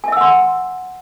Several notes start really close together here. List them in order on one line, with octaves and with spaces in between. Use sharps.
G#5 E5 E6 F#5 C6